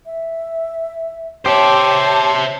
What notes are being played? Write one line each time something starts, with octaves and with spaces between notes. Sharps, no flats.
E5
G4 C5 C#5 E5 A5